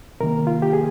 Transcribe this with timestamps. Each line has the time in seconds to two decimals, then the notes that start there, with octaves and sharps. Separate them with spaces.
0.20 C3 D#3 A#3 A#4
0.47 F4
0.62 G4
0.73 G#4